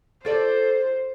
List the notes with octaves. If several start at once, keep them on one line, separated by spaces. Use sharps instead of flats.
F4 A4 C5 D5